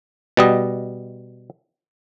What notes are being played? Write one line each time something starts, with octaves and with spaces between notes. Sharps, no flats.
B2 G3 D#5